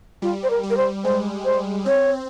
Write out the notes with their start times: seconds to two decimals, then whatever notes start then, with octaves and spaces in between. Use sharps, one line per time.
0.22 G3 F4
0.43 C5
0.50 A#4
0.63 G3
0.70 A#4
0.77 C5
1.04 G#3 C5
1.45 C5
1.86 C4 C#5